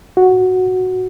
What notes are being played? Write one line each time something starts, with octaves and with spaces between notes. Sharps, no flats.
F#4